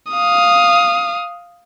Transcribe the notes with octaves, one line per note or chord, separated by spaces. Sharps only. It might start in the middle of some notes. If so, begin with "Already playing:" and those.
F5 D#6